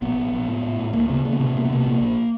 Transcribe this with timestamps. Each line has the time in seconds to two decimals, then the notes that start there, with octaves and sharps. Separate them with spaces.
0.02 A#1 B3
0.18 A#1
0.33 A#1
0.48 A2
0.63 A2
0.79 A2
0.93 D2 A#3
1.09 C#3 B3
1.25 C#3 A#3
1.32 B3
1.40 C3 A#3
1.48 B3
1.55 C3 A#3
1.65 B3
1.70 C3 A#3
1.80 B3
1.85 A#1 A#3
2.01 A#1